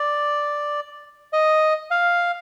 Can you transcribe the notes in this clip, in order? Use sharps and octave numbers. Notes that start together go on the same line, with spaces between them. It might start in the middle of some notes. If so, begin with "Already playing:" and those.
Already playing: D5
D#5
F5